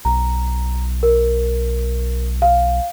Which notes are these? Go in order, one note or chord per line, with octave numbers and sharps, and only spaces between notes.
B1 A#5
A#4
F5